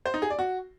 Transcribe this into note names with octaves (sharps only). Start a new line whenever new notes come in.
C5
D#4
G#4
D5
F#4